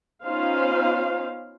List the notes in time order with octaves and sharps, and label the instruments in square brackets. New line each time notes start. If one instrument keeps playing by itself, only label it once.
[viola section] B3 C#4 D#4 F4 C5 F5